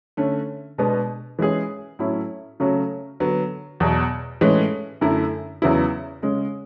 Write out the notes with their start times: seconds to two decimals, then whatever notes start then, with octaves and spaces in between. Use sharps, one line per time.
0.17 D3 A3 C#4
0.78 B2 G#3 B3 D4
1.39 E3 G#3 C#4 G#4
1.99 A2 F#3 C#4 E4 A4
2.60 C#3 F#3 A3 C#4 F#4
3.20 D3 F#3 B3
3.80 E2 B2 F#3
4.41 A2 E3 G#3 C#4
5.01 F#2 D3 A3 E4
5.62 E2 C#3 F#3 B3 E4
6.22 C#3 G#3 C#4